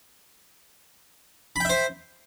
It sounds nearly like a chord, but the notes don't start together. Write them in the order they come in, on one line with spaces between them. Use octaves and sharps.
B5 G5 E5 C5